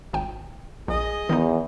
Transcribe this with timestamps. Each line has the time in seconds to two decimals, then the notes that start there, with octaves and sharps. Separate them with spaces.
0.13 G#1 G5
0.88 A#1 G#4 D#5
1.29 E2 D#3 B3 D#4